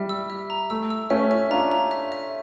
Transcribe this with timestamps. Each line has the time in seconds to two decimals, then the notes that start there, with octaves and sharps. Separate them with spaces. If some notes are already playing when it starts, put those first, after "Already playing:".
Already playing: G3 E5
0.09 E6
0.30 E5
0.50 A#5
0.70 A3 E6
0.90 E6
1.10 A3 C#4 E5
1.31 E5
1.50 D4 F4 A#5
1.71 A#5
1.91 E5
2.12 E5